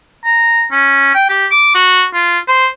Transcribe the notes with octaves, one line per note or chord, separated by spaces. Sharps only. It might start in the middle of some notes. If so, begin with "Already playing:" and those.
A#5
C#4
G5
G4
D6
F#4
F4
C5